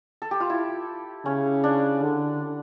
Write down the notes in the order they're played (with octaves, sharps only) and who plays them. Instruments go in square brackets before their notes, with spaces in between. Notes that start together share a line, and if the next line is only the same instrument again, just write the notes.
[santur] A4
G4
F4
E4
[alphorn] C#3 [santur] C#4
[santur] D4
[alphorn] D3